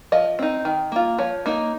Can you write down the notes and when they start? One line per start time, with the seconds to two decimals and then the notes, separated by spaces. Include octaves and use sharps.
0.12 F3 D#5
0.39 C4 D#4
0.65 D#3
0.92 A#3 F4
1.18 F3 C#5
1.46 A#3 D#4